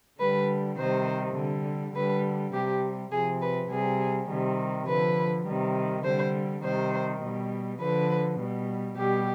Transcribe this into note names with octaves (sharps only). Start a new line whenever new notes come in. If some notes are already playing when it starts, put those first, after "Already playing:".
D3 G3 B4
C3 D#3 G3 C5
D3 G3
D3 G3 B4
C3 G3 G4
C3 F3 G#4
B4
C3 G3 G#4
C3 D#3 G3
D3 F3 B4
C3 D#3 G3
D3 G3 C5
C3 D#3 G3 C5
B2 G3
D3 F3 B4
B2 G3
B2 G3 G4